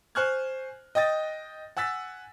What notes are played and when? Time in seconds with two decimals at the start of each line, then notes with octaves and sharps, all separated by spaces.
0.15 C5 G#5 C#6 F6 F#6 G#6
0.95 D#5 G5 D#6 A6
1.77 F#5 G#5 E6 A6 B6